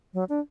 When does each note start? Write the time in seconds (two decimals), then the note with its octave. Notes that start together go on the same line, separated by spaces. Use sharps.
0.14 F#3
0.29 D4